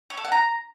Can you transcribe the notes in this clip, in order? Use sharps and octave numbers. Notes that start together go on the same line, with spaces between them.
C#5
A4
F#5
A#5